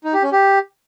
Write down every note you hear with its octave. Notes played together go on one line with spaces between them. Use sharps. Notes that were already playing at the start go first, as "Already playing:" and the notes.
D#4
G4
C#4
G4